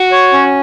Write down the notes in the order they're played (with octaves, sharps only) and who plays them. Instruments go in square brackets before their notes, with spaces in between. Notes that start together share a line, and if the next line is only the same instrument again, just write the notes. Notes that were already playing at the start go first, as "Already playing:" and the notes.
Already playing: [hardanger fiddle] F#4
[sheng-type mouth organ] C#5
C#4